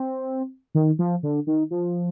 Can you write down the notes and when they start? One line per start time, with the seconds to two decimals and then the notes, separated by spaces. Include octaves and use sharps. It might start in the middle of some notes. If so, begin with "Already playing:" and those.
Already playing: C4
0.75 D#3
0.99 F3
1.23 D3
1.47 D#3
1.71 F3